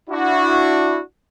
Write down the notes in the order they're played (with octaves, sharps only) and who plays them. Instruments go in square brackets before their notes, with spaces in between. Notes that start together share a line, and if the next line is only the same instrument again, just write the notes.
[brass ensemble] D4 E4 F#4